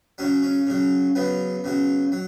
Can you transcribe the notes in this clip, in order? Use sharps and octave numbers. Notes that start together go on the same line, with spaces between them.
C#3 F#3 C#4
C#4
C#3 F#3
C#3 F#3 B3
C#3 F#3
F#3